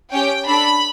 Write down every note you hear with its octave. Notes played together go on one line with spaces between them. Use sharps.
C#4 G4 G5
D4 A4 B5